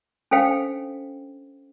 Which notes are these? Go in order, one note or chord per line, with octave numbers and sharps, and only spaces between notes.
C#4 D4 A4 C5 F5 G5